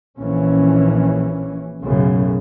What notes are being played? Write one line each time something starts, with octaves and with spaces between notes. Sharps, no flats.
A#1 E3 C#4
B1 F#2 A2 C#3